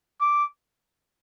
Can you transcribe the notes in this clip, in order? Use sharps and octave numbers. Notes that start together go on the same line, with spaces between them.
D6